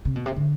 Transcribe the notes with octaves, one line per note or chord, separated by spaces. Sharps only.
C3
B2
C3
D3